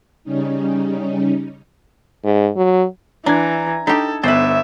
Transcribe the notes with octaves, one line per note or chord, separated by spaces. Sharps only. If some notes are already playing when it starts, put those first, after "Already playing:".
C#3 G3 C#4 D#4
G#2
F#3
E3 D4 A#5 G#6
D4 D#4 G4 A4
G1 B3 B4 C5 E5